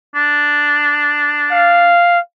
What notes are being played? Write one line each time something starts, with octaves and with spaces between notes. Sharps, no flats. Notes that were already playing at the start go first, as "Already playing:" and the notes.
D4
F5